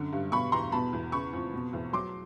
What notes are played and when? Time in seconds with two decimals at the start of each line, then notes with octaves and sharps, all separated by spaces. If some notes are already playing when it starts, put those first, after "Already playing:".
Already playing: F#2 D3
0.13 G2
0.32 B2 B5 C#6
0.52 E2 A#5 C6
0.72 B2 A5 B5
0.93 E2
1.12 C#3 B5 C#6
1.33 F2
1.54 B2
1.73 E2
1.93 F#3 C6 D6